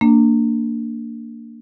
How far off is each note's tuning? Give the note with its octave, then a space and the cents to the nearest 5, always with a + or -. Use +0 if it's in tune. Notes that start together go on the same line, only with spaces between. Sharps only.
A#3 -20 D4 +0